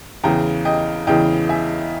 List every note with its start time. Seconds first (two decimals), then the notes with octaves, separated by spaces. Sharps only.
0.24 E2 C#3 E3 G5 A#5
0.65 D#5 G5
1.07 E2 C#3 E3 D#5 G5
1.49 E5 G#5